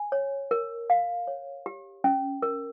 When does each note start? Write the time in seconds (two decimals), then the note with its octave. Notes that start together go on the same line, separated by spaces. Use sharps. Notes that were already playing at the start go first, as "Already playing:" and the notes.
Already playing: G#5
0.12 C#5
0.51 A#4
0.90 F5
1.27 C#5
1.66 G4
2.04 C#4
2.42 A#4